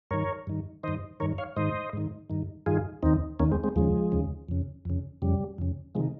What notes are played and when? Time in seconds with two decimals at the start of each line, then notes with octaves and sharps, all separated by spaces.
0.11 G2 D#3 A#4 C#5
0.47 G2 D#3
0.83 G2 D#3 C5 D#5
1.20 G2 D#3 A#4 C#5
1.38 C#5 F5
1.56 G#2 D#3 C5 D#5
1.93 G#2 D#3
2.30 G2 D#3
2.66 G2 D#3 F4 G#4
3.03 D#2 D#3 C4 D#4
3.39 D#2 D#3 A#3 C#4
3.51 G#3 C4
3.64 G#3 C4
3.76 D#2 C#3 F3 G#3
4.12 D#2 C#3
4.49 F2 C#3
4.85 F2 C#3
5.22 F2 C#3 G3
5.58 F2 C#3
5.95 C3 D#3 F3 G#3